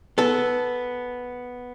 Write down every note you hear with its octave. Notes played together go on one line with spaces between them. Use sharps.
B3 A4